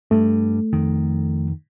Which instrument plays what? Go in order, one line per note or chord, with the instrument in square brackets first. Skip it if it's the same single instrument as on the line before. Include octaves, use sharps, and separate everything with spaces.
[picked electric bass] G2 [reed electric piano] A3
[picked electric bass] F2 D#3